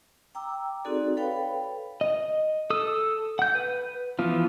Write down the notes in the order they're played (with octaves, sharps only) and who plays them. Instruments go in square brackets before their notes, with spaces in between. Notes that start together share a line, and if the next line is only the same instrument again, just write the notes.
[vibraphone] G5 A#5 D6 E6
C4 D#4 F#4 G#4 A4 D5
A4 B4 C#5 F5 G5 B5
[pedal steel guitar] D#5
A4 D#6 E6
F#5 G6
B4
E3 F3 B3 F4